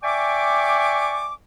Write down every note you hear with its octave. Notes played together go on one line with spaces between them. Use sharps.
D5 E5 G5 G#5 C#6 D6